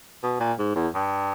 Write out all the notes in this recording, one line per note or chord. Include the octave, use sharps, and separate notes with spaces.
B2
A#2
G#2
E2
G2